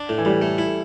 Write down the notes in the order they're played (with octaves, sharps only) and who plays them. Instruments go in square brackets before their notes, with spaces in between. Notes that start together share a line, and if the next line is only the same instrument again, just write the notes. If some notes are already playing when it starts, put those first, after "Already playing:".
Already playing: [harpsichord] D4
A2
[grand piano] E3
[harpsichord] A2 [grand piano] G3
[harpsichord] A3
E4